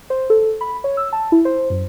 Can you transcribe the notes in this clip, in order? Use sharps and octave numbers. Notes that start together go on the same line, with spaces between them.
C5
A4
B5
C#5
E6
A5
E4
C5
F#2